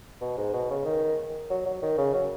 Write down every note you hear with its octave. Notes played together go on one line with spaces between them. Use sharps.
B2
G#2
B2
C#3
D#3
F#3
F#3
D#3
C#3
F#3